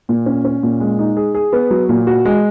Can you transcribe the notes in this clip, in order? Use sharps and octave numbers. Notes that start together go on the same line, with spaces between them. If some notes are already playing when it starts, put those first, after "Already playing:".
A#2
C#4
C#4
A#2
G#3
D#4
G#4
G#4
B3
F#3
A#2
F#4
G#3